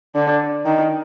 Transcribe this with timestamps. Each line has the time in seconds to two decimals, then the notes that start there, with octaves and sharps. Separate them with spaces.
0.16 D3
0.66 D#3